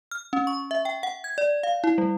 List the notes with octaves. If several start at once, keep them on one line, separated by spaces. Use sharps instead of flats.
F6
C#4
C#6
E5
G5
F#5
G#6
D5
F5
E4
G3